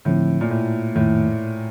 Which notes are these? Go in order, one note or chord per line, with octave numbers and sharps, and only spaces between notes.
A2 D3 F3 C4
A#2
A2
F2 A2 D#3 A3